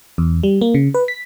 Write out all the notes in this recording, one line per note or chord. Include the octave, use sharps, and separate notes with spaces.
E2
G3
A#3
C#3
B4
B6